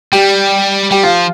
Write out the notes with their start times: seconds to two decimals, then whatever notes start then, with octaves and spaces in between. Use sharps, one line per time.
0.12 G3 G4
0.91 G3 G4
1.03 F3 F4